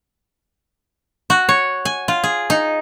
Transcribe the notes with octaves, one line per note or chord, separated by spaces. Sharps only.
F#4
C#5
G#5
F4
G#4
D#4